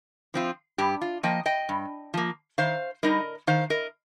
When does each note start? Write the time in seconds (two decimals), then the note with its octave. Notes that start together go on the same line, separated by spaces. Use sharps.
0.34 F3 C4 F4
0.78 G2 G4
1.01 F4
1.23 F3 A#3 D#5 G5
1.46 D#5 G5
1.69 G2
2.14 F3 A#3
2.58 D#3 C5 F5
3.03 G3 D#4 A#4 D#5
3.47 D#3 C5 F5
3.70 A#4 D#5